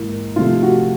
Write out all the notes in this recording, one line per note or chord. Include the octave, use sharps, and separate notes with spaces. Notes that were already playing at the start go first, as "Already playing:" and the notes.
Already playing: G#2 E3 A#3 E4
C3 F3 A3 F4
F#4